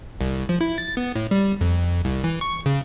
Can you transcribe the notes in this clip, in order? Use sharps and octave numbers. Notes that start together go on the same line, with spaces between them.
C2
F3
E4
A6
B3
A2
G3
F2
C2
E3
C#6
C#3